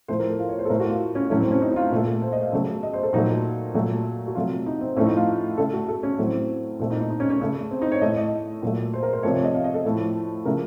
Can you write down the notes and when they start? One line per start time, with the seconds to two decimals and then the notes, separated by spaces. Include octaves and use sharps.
0.08 A2 F3 A3 C5
0.19 A#4
0.30 A4
0.39 F4
0.49 C#5
0.59 C5
0.65 A4
0.69 A2 A3 A#4
0.80 F#4
0.89 F4
1.15 C#4
1.30 A2 F#3 A3 C#4
1.41 C4
1.51 C#4
1.61 D#4
1.71 D#4
1.76 F4
1.92 A#2 A3
2.07 A4
2.22 C5
2.33 D#5
2.43 F5
2.52 C#3 F#3 A3
2.83 D#5
2.93 C5
3.03 A4
3.13 A#2 F#3 A3 D#4
3.74 A#2 F#3 A3
4.28 F#4
4.35 C3 F#3 A3 F4
4.66 D#4
4.81 C4
4.97 A2 F3 A3 C#4
5.06 D#4
5.16 F4
5.57 C#3 A3 A4
5.73 F#4
5.89 A4
6.03 C#4
6.18 A2 F#3 A3 C4
6.79 A#2 A3 C4
6.90 D#4
7.00 D#4
7.10 D#4
7.20 C#4
7.30 C#4
7.41 C#3 A3
7.71 C4
7.82 D#4
7.92 C#5
8.02 A3 D#5
8.05 A2
8.17 D#5
8.62 A#2 F#3 A3
8.94 C5
9.03 A#4
9.13 C5
9.23 C3 F3 A3 C#5
9.34 C#5
9.44 D#5
9.54 F5
9.64 D#5
9.74 A4
9.85 A2 F3 A3
10.45 C#3 F3 A3 A#4